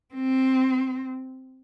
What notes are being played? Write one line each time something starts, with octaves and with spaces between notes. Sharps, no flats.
C4